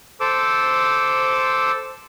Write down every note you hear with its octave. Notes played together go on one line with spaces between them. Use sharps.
A4 C5 D6 E6